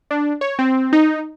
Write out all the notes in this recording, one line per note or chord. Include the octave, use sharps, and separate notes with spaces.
D4
C#5
C4
D#4